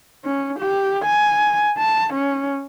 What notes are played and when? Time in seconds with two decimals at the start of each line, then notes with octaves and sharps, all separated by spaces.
0.24 C#4
0.59 G4
1.05 G#5
1.78 A5
2.13 C#4